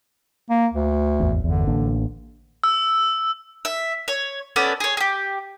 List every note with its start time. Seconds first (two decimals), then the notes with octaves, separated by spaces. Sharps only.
0.50 A#3
0.73 D2
1.20 G#1 E2
1.44 G1 E2 D3
1.67 A1 A#3 D4
2.64 E6
3.65 E5
4.08 C#5
4.56 B3 C#4 A4 D5
4.80 G#4 C#5
4.97 G4 G#4